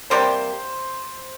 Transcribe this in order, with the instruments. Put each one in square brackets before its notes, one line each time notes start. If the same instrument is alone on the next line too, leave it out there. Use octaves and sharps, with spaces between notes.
[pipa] C3 G3 A#3 G4 [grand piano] C5 C6